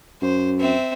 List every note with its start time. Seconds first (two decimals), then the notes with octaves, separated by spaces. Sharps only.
0.22 F#2 C5
0.60 C4 E5